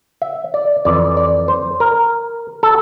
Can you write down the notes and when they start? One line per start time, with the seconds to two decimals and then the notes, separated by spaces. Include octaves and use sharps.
0.22 E5
0.54 D5
0.85 F2 E3 D5
1.17 D5
1.48 C5
1.80 A#4
2.63 A4